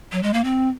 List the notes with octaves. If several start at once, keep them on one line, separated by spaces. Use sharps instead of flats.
F#3
G#3
A#3
C4